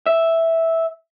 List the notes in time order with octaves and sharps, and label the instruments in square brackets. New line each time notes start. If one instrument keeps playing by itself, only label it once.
[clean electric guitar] E5